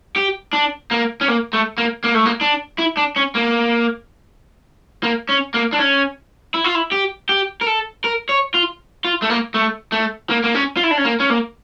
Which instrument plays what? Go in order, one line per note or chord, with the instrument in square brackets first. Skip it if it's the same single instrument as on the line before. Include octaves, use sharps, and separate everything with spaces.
[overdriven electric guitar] G4
D4
A#3
C#4
A#3
A3
A#3
A#3
A3
A#3
D4
E4
D4
C#4
A#3
A#3
C#4
A#3
D4
C#4
E4
F4
E4
G4
G4
A#4
A4
A#4
C#5
F4
F4
A3
A#3
A3
A3
A#3
A#3
C#4
F4
E4
D4
C#4
A#3
C#4
A#3